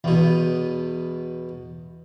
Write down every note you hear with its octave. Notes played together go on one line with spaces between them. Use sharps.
E2 B2